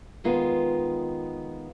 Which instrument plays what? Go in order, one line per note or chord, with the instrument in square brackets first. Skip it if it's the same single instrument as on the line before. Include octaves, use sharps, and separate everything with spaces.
[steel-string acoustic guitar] D#3 G#3 B3 F4